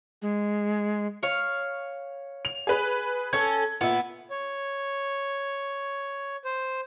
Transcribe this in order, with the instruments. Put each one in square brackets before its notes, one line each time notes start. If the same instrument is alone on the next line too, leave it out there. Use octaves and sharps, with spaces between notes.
[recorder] G#3
[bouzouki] C#5 F5
[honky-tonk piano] F7
G#4 B4
[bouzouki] C#4 A4 [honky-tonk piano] G#6
[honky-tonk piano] A#2 [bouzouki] B3 E4
[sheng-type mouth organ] C#5
C5